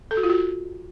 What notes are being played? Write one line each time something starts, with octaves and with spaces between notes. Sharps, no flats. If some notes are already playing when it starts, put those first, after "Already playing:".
A4
F#4
F4
F#4